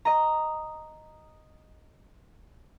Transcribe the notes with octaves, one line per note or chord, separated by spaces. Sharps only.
D#5 A#5